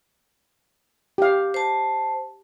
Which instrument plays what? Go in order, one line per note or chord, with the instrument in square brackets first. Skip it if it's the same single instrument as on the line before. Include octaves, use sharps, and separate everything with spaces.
[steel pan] G4 F5
[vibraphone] C5 A5